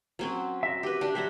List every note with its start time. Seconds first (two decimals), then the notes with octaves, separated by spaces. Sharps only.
0.19 F#3 C4 C#4
0.63 F#4 E5
0.83 G4 B4
1.01 D4 G4
1.15 F#3 G4 C5 E5 F#5